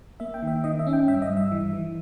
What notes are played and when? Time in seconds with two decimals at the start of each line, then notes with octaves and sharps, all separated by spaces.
0.20 A#3 E5
0.34 G5
0.43 D#3 E5
0.64 D#3 D#5
0.79 E5
0.87 C#4
0.93 G5
1.08 G2 E5
1.22 D#5
1.30 G2
1.37 E5
1.52 E3
1.73 E3